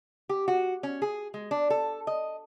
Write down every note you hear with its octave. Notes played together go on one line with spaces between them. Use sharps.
G4
F#4
C#4
G#4
G#3
D4
A4
D#5